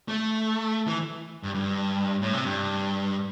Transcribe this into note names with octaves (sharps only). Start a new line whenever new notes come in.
A3
E3
G2
G2
A2
C3
G2